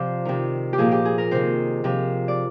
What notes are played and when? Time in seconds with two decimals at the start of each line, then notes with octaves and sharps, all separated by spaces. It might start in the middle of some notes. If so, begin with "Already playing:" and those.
Already playing: C3 F3 C5 D5
0.25 C3 D#3
0.73 G4
0.78 A#2 F3 G#4
0.91 G4
1.05 G#4
1.18 A#4
1.31 C3 D#3 C5
1.84 C3 F3
2.28 D5